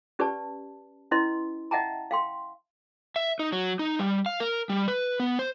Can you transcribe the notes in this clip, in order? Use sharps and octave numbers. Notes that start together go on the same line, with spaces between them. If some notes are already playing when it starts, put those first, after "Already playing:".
C#4 G4 B4 D5 A5
C#4 E4 B4 D#5 C6
D#5 E5 F#5 G5 A5 A#5
F5 G5 C6
E5
D#4
F#3
D#4
G3
F5
A#4
G3
B4
B3
C5